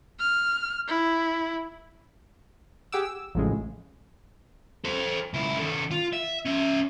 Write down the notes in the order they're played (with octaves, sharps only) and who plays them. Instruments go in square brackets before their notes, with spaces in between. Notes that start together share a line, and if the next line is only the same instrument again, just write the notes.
[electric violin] F6
E4
[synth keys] G4 G#4 F#5 D6 E6
E6
A1 F2 A2 C#3 G#3
[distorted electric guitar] A4 C5
C#2 E4
D#3 A4
F4
E5
C#4 E5